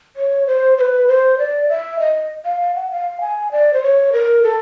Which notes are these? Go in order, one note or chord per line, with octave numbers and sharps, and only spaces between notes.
C#5
C5
C5
B4
C5
D5
E5
D#5
F5
F5
F#5
F5
G#5
D5
C5
C#5
A#4
A4